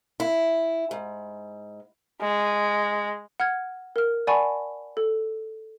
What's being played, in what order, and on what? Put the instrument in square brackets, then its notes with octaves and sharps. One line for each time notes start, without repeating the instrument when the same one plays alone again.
[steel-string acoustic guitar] E4
G#2
[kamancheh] G#3
[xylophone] F#5 F6 G#6
A#4 F6
D5 F#5 G#5 A5 B5 C#6
A4